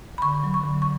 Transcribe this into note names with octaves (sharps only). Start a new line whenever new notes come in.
B5
D3 C#6
F#3
C#6
D3
C#6